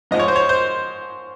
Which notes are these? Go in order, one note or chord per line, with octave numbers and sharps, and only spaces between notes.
G#2 F3 G#3 D#5
C#5
C5
C#5
C5